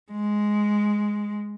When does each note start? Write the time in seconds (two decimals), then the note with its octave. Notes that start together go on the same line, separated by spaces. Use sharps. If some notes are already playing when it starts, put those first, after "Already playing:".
0.12 G#3